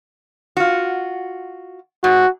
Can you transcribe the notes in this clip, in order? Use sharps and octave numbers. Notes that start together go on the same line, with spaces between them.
F4 F#4
G#2 F#4